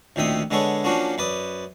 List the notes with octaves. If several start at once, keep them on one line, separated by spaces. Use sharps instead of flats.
D2 A#2 D#3 C4 E5 D#6
D3 G#3 B3 G#4 A4 C#5
F3 A#3 C#4 D4 F4 F#4
F#2 B4 D5 D#6